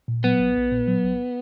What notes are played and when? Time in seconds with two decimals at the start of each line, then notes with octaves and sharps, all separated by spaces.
0.08 A#2
0.24 F#3 B3
0.40 A#1
0.56 A#1
0.71 A#2
0.88 F#3
1.03 A#1